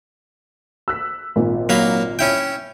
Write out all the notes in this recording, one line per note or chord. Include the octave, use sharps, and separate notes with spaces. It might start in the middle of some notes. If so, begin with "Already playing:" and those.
E6 F#6 B6
G#1 A#2
F#3 A#3 B5
C#4 E4 G5